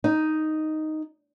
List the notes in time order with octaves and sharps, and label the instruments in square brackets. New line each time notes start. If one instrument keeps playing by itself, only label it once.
[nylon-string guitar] D#4